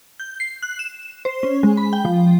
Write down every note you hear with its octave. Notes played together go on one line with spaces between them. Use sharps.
G6
C7
F#6
E7
C5
C#4
G#3
B5
G5
F3